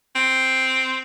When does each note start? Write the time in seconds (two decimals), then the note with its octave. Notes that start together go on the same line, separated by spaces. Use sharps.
0.15 C4